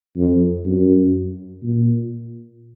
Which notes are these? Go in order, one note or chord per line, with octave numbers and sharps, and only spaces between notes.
F2
F#2
A#2